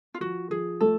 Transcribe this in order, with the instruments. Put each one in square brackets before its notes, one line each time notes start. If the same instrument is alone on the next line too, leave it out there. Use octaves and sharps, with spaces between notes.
[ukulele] F4
[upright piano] F3 [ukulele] F#4
[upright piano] F3 [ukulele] G#4
[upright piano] A3 [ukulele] A4